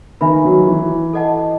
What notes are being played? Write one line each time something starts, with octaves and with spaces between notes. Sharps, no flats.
D#3 B4 E5 G#5 B5
D#3 F#3
E3
A4 D#5 F#5 A5